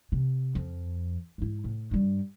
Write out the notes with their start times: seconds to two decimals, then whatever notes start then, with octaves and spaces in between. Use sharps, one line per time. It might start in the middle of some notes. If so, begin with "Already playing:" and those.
0.12 C3
0.55 F2
1.38 G#2 E4
1.64 A2
1.91 G2 G3